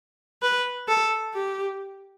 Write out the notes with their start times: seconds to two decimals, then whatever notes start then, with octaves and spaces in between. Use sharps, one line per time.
0.42 B4
0.88 A4
1.34 G4